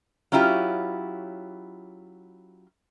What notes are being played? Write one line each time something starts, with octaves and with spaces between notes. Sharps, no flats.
F#3 C#4 E4 F4 G4